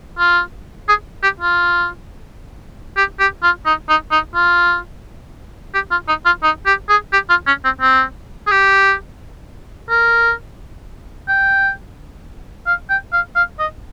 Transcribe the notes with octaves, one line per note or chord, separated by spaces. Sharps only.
F4
G#4
G4
F4
G4
G4
F4
D#4
D#4
D#4
F4
G4
F4
D#4
F4
D#4
G4
G#4
G4
F4
C#4
C4
C4
G#4
G4
A#4
G5
F5
G5
F5
F5
D#5